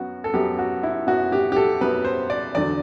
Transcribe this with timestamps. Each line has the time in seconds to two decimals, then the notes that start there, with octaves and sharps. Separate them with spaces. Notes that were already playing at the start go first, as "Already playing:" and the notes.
Already playing: F#2 F#3 B3 F#4
0.24 A4
0.34 F#2 F#3 B3 G4
0.59 F#4
0.83 E4
1.07 F#2 F#3 B3 F#4
1.32 G4
1.52 G4
1.56 A4
1.81 F#2 F#3 B3 B4
2.05 C5
2.30 D5
2.55 E2 D3 F#3 D5